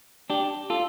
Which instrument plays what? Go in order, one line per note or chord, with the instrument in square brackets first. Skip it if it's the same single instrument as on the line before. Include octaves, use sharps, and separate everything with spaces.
[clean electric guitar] D4 G4
F4 A4